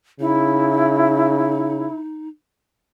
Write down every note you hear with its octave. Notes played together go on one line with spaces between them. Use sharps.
C#3 D#4 E4